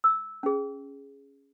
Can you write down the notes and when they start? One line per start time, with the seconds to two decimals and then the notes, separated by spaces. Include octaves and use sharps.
0.04 E6
0.43 C#4 G#4